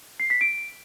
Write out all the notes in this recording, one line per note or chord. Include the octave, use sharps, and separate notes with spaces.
C7
B6
D7